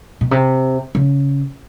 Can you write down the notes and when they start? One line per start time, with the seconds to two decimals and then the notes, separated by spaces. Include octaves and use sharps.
0.21 B2
0.31 C3
0.95 C#3